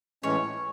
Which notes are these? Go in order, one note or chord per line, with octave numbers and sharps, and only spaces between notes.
A2 E3 G#3 C#4 C#5